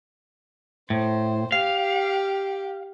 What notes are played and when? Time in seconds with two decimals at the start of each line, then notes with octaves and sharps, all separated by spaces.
0.90 A2 C5
1.52 G4 F5